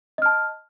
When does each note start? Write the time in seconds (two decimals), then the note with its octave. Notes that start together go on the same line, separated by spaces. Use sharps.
0.18 D#5
0.22 F6
0.26 A5